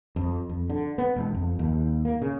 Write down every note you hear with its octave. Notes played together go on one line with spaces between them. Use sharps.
F2
F2
D3
B3
E1
F2
D#2
A#3
C#3